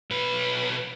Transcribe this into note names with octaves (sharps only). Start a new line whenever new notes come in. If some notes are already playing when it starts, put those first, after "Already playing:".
B1 B4